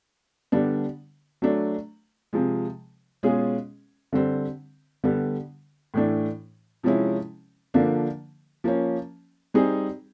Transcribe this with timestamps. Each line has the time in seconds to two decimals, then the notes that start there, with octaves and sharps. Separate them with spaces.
0.52 D3 G3 B3 D4
1.42 F#3 A3 D4
2.33 C3 F3 G#3
3.23 B2 G#3 C#4 F4 G#4
4.13 D3 G3 C4
5.04 D3 G3 B3
5.94 A2 E3 A3 D4
6.83 C3 F3 G#3 C#4 E4
7.74 D3 F3 A#3 D4
8.64 F3 A#3 C#4
9.54 G3 C4 D#4 G#4